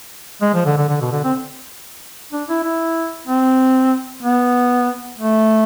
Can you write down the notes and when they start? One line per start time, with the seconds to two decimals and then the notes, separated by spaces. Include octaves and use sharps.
0.42 G#3
0.54 F3
0.66 D3
0.78 D3
0.89 D3
1.01 B2
1.12 D3
1.24 C4
2.33 D4
2.49 E4
2.64 E4
3.28 C4
4.23 B3
5.19 A3